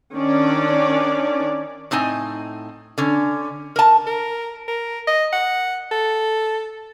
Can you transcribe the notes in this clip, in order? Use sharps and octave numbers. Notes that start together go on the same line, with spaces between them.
D#3 C#4 D4 D5
A2 C4 D#4 G#5
D3 C#4
A#4 A5
A#4
A#4
D#5
F#5
A4